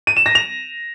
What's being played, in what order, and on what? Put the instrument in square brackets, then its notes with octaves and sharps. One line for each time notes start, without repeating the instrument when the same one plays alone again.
[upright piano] D#7
E7
A#6
F7